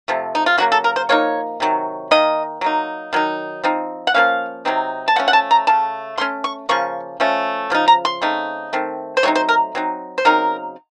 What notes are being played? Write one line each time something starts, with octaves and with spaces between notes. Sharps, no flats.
C3 F3 A3
D#4
F4
C#3 F#3 A#3 F#4
A4
A#4
C5
F3 A#3 D#4 C#5
C3 D#3 F#3
D#3 A#3 D#4 D#5
F#3 A#3 D#4
D#3 F#3 D#4
F3 C4 D#4
F#5
F3 A#3 C#4 F5
C3 F#3 C4 D#4
A5
F3 A3 C#4 F#5
F#5
A5
A#5
C#3 A3 A5
C#3 A3 C#4 C6
C#6
C#3 F3 A#3 C#4 C#6
F3 A3 C#4
C#3 F3 D#4
A#5
C6
C#3 A3 C4 D#4
D#3 A3 C4
C5
F#3 A3 C4 D#4 C#5
C5
A#4
F#3 C4 D#4
C5
C#3 F#3 C4 D#4 A#4